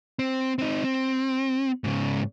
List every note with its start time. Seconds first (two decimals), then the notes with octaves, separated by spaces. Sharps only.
0.19 C4
0.59 C4 D#4
0.84 C4
1.84 G#2 C#3